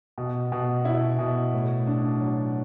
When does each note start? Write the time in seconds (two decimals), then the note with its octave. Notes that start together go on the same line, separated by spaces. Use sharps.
0.18 B2
0.52 B2
0.85 E4
1.19 B2
1.54 A2
1.87 D4
2.21 F#3